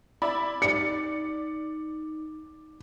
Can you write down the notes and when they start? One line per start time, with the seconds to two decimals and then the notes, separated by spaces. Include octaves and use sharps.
0.22 E4 D5 B5
0.62 D#4 D5 C#7